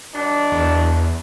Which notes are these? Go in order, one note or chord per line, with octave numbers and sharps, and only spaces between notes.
D#3 F#3 D4
E2